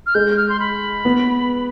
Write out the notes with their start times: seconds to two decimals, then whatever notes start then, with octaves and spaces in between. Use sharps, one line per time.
0.06 F6
0.15 G#3 G6
0.37 F6
0.49 C6
0.60 B5
1.05 B3